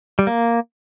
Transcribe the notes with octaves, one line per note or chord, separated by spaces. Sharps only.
G3
A#3